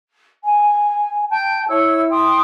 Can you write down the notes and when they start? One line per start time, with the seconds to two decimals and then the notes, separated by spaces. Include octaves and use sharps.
0.44 G#5
1.30 G5 A5 G6
1.68 E4 C#5 E6
2.09 G5 C6 D#6